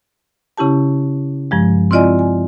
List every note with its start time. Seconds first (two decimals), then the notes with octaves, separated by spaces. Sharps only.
0.58 C#3 C#4 E4 G4 A5
1.51 G2 F3 G#3
1.91 C4 E4 F4 D5 D#5 G#5
2.19 G#5